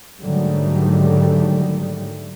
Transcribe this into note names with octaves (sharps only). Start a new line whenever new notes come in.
G#2 D3 D#3 F#3 G3 A3